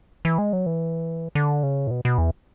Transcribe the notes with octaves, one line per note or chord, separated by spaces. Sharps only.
E3
G#3
F#3
E3
D3
C#3
A2
B2
B2
E2